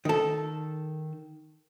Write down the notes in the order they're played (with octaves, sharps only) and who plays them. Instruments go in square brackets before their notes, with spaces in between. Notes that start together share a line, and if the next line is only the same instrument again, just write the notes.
[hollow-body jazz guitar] D#3 A4